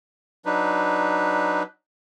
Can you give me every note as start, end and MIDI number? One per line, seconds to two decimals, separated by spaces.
0.45 1.63 54
0.45 1.63 62
0.45 1.63 63
0.45 1.63 71